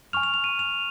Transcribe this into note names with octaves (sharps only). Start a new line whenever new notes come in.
G#5 C#6 F6 F7
F7
F7
D#7
F7